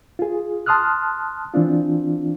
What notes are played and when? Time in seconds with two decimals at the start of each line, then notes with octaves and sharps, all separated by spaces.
0.19 F4 G#4
0.66 A5 C6 D#6 F6 F#6
1.54 E3 C4 D4 F4